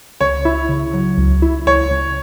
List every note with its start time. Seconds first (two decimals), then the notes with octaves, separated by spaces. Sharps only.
0.21 C#2 C#5
0.45 E4
0.69 C#3
0.94 F#3
1.18 C#2
1.42 E4
1.67 C#2 C#5
1.91 C#2